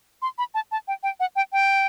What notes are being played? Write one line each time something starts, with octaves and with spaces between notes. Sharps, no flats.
C6
B5
A5
A5
G5
G5
F#5
G5
G5